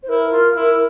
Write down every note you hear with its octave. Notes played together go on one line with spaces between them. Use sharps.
C5
E4 A#4
F4
E4